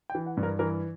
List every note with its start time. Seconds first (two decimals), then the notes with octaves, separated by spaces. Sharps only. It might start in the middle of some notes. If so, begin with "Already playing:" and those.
0.10 G5
0.15 E3
0.26 F#5
0.37 G2
0.43 A#4
0.59 E3 A#4